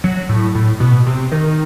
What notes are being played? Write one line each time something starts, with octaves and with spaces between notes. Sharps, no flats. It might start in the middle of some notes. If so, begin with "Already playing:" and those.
F#3
A2
A2
B2
C3
D#3